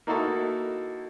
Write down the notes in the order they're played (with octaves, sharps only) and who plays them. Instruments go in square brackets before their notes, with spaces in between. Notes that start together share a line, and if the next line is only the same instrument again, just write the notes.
[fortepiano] A#3 D#4 E4 F#4 A4